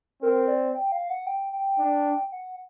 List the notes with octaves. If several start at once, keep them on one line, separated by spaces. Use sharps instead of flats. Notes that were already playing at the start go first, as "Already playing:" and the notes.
C4 A#4
D5
G5
F5
F#5
G5
G5
D4
F#5